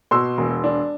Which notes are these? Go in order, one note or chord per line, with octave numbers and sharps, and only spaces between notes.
B2 C6 E6
E1
D4